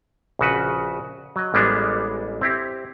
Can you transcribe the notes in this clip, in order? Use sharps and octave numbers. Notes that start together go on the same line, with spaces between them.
A#1 C#3 F#4 B4
F#3 D#5
A1 G3 G#3 A#3 B3 D4
C4 E4 G4